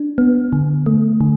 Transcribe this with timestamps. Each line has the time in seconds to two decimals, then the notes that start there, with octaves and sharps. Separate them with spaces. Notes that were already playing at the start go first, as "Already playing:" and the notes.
Already playing: D4
0.18 B3
0.53 D3
0.86 A3
1.21 D3